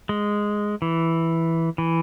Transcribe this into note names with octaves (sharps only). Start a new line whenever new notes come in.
G#3
E3
E3